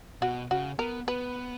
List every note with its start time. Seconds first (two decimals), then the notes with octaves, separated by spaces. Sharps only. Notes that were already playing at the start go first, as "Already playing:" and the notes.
0.22 B2 F#4
0.51 C#3 F#4
0.79 B3 A#4
1.08 B3 B4